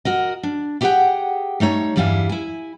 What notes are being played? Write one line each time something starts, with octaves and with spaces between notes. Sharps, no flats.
F#4 A#4 D#5
D4
E4 G4 G#4 C#5 F#5 G5
G3 A3 D#4 C#5
E2 G2 G3 E4 F5 G#5
E4 G#5